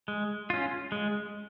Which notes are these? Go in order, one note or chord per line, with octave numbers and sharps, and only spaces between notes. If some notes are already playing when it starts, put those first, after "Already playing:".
G#3
C#4 F4
G#3